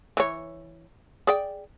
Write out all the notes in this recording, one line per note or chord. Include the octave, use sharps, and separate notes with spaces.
E3 C#5
G#4 D5 G5